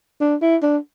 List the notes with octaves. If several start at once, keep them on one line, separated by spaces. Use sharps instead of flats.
D4
E4
D4